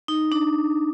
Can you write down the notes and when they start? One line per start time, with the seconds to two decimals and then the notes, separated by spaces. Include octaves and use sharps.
0.08 D#4
0.32 D4